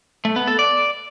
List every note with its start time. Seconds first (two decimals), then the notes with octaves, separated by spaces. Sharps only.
0.25 A3
0.36 B3
0.47 A4
0.59 D5